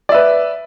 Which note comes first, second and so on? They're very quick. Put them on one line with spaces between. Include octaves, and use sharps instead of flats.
D5 E5 B4